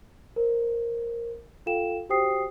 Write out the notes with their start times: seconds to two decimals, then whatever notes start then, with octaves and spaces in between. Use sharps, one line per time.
0.36 A#4 C5
1.66 F4 A4 F5 G5 E7
2.09 F#4 G4 C5 G5 D#6 C7